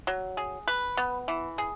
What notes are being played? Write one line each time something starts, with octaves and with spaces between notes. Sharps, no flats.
F#3
G#4
B4
B3
E3
G#4